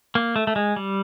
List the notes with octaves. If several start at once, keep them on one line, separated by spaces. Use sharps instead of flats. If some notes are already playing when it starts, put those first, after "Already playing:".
A#3
A3
A3
G#3
G3